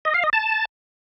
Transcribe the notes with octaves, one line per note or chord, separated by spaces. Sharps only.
D#5
F5
D#5
A5